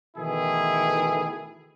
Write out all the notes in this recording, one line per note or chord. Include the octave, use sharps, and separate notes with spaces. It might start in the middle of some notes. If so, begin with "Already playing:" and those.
B2 D#3 E3 A3 E4 G#4